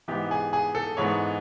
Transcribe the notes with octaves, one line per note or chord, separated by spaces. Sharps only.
G#2 E3 G#3 B3 G4
G#4
G#4
A4
G#2 E3 G#3 B3 C#5